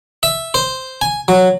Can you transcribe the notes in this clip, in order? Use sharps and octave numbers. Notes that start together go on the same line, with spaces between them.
E5
C5
G#5
F#3